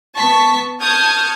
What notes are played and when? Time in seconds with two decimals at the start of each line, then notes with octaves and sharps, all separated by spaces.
0.16 B3 A5 C#6 B6
0.80 A5 C#6 D#6 F6 G6 G#6